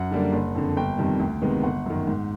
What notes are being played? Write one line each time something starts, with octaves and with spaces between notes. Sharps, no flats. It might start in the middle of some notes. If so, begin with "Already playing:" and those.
Already playing: F#2 F#5
D3 G3 A#3 D4
F#1
F2 D3
G1 G5
F2 C3 D#3 G3
D2
C3 D#3 G#3 B3
G1 F#5
F#2 D#3
G#2